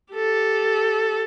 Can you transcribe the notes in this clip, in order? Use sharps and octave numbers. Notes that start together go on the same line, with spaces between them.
G4 A4